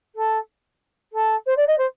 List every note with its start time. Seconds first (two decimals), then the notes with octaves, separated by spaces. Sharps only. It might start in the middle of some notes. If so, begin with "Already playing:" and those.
0.15 A4
1.12 A4
1.46 C5
1.56 D5
1.67 D#5
1.78 C5